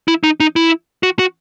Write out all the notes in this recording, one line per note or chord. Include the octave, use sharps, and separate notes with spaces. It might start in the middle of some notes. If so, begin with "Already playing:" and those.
E4
D#4
D#4
E4
F#4
F#4